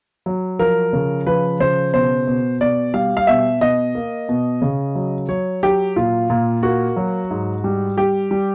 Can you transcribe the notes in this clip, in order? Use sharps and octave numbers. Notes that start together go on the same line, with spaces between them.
F#3
F3 A#4
C#3
F3 B4
C#3 C5
B2 C5
B2
B2 D5
G3 F5
F5
B2 E5
B2 D#5
A#3
B2
C#3
F#3
F#3 C#5
F#3 G4
A#2 F4
A#2
A#3 F#4
F#3
G#2
G3
G3 G4
G3